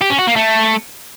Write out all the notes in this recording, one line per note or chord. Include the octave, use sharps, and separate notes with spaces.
G4
C#4
F#4
A#3
A3